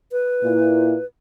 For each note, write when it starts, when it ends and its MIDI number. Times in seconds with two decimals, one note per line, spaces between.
0.12 1.05 71
0.42 0.95 46
0.42 0.95 64